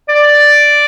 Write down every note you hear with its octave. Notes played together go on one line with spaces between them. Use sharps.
D5